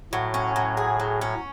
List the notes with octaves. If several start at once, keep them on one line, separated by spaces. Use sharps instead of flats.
A2 F#3
C#4
F#3
G#4
F#3
C#4